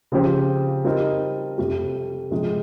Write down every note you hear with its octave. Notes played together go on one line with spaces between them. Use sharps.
C#3 F3 C4 G4 C5
G3 C4 D#4 A#4
F2 C3 G3
C3 F3 G#3